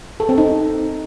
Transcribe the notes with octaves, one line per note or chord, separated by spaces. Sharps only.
A4
C4
D#4